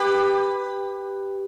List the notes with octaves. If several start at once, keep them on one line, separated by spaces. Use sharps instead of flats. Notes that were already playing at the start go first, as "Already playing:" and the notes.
Already playing: G4 B4